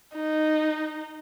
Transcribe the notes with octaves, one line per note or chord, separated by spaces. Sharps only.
D#4